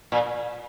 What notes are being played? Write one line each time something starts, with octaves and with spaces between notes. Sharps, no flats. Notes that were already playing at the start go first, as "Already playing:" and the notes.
A#2